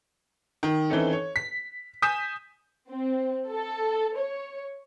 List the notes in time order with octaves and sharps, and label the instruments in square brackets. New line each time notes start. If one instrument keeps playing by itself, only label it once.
[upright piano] D#3
E3 C4 C#4 D#4 A4
C#5
B6
G#5 D#6 G6 B6 E7
[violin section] C4
A4
C#5